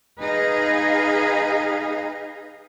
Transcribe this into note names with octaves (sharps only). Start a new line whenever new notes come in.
D#4 G#4 B4 D#5 F5